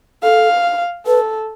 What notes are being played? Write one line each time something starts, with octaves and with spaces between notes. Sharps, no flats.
A4 F5
A4 B4